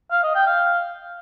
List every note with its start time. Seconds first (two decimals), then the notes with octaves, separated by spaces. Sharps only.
0.11 F5
0.23 D#5
0.35 G5
0.47 F5